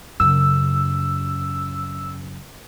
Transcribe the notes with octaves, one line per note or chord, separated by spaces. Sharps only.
F#2 C#3 E6